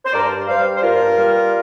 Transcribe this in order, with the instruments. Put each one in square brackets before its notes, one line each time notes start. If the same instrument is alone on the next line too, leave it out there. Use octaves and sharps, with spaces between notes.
[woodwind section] C5
G2 A#4 D5
G3 C5 F5
C5
G2 F4 A#4
G3